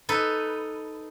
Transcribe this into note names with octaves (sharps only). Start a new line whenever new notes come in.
D#4 A4 B4